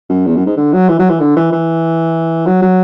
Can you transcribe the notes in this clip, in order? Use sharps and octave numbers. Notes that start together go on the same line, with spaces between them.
F#2
E2
F#2
G#2
D3
F#3
E3
F#3
E3
D3
E3
E3
F#3
F#3